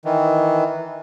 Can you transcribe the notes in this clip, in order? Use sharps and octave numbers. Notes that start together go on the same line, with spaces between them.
D#3 E3